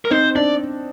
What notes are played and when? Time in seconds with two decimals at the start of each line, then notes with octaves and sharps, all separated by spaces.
0.05 A#4
0.10 C4 D#4 C5
0.35 D4 D5